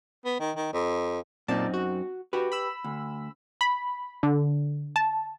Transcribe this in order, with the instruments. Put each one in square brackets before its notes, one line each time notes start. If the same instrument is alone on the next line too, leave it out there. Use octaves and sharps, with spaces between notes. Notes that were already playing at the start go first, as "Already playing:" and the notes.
[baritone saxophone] B3
D#3
D#3
F2
[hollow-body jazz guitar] F#2 C4 D#4 [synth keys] A#2 D5 A5
[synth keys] F#4
[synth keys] F#4 [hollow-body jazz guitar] G4 B4
[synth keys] B5 E6
[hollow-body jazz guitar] D2
[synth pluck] B5
D3
A5